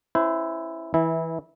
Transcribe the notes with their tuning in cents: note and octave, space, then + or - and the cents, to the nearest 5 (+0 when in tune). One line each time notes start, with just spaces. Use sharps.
C#4 -30 E4 +0 C5 -35
E3 -10 E4 -20